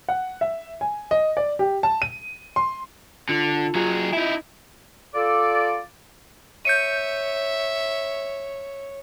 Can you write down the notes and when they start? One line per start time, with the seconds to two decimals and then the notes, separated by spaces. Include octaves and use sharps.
0.09 F#5
0.41 E5
0.81 G#5
1.11 D#5
1.37 D5
1.59 G4
1.83 A5
2.02 D#7
2.56 C6
3.29 D3 F4
3.75 F#3 F4 G#4
4.13 D#4 E4
5.15 F4 A4 D5
6.65 C#5 E5 G6 C#7 D#7